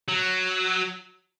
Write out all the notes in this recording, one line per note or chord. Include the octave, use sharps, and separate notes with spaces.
F#3